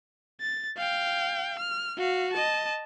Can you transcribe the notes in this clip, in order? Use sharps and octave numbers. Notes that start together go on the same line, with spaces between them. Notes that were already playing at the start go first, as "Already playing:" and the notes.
A6
F5 G5
F6
F#4 F5
D#5 A5